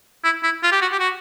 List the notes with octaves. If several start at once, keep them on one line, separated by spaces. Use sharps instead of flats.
E4
E4
F4
G4
F#4
G4
F#4